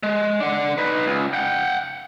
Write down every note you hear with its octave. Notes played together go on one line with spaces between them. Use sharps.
G#3
D4 F#5
D#4 B4
C#2
F#5 G5